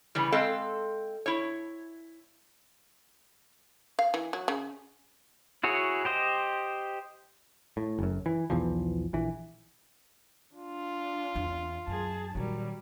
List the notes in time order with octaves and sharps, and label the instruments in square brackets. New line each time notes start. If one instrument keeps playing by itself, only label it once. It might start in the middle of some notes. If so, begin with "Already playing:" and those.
[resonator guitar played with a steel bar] C#3 E3 G3
G#3 C4 A4 F5
E4 C#5
[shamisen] F5
E3
F#3
C#3
[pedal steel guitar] E4 F#4 G#4 C#5
G4 C5 D#5
[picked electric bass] A2
F#1 F#2
E3
B1 E2 E3 F3
A#1 E3
[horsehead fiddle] D4 [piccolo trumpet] F4
[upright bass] E2 C4
[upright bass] F#2 [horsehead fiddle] G#4 A5
[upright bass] A#2 D#3 [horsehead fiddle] F#3 G3